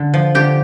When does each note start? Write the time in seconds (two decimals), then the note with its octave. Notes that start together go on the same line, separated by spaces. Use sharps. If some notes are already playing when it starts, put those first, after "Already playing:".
Already playing: D3
0.14 F3
0.35 D3 G4